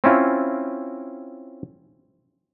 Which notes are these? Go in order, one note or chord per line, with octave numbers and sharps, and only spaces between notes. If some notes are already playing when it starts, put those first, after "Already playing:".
C4 C#4 E4 F4